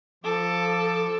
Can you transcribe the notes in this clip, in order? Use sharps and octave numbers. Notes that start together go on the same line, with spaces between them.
F3 A4 D6